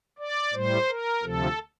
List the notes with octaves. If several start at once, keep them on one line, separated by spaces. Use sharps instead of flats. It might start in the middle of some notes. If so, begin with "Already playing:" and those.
D5
A2 G3 C5
A#4
D2 C3 F3 A4